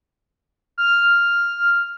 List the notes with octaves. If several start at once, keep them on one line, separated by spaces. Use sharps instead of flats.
F6